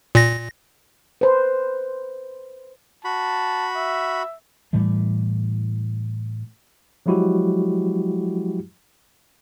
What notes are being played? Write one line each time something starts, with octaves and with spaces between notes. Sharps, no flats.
A#2 A#6
B4 C5
F#4 A5 B5
E5
A2 E3 G3 A3
F3 F#3 G#3 E4 F#4 G4